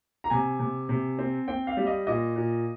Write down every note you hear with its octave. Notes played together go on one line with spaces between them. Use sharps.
A#5
C3 G#5
C3
C3
C4
C4 G5
F5
G3
D#5
A#2 D#5
A#2